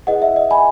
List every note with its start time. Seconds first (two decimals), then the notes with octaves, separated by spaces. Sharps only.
0.07 E4 G#4 B4 D#5 F#5
0.22 E5
0.36 D#5
0.51 G#5 B5